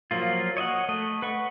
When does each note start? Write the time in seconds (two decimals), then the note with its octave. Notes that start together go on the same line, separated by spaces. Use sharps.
0.11 F3 F#3 A#3 F4
0.57 C#5 D#5 E5 F#5
0.89 A3 D#5
1.22 B4 F#5 C#6